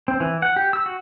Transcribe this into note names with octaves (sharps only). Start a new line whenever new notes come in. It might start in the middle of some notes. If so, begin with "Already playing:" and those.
C4
E3
F#5
G4
E6
F#4